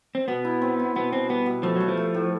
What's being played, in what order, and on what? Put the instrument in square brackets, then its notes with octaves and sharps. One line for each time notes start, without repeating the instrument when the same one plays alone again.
[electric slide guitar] C4
[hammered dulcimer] B2 [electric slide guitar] B3
[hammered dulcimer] E4
C4
E4
[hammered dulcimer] B2 [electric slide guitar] B3
[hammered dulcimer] B2 [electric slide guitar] C4
[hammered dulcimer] G3 [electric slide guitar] B3
[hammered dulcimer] B2
[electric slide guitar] F3 [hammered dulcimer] A3
[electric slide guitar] F#3 [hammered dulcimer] A3
[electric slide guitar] F3
[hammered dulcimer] A3
A2